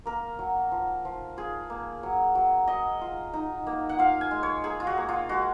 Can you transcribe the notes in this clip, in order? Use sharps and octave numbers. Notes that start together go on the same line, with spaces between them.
A#3 A#4
F#3
F3
F3
F4 G#4
A#3
F#3
F#3
F#3 D#5
F4
D#4
A#3
F#5
F4 F5
G#5
G#3
C#5
A#3 G#4
F4
F#4
A#3
F4
G#3 F#4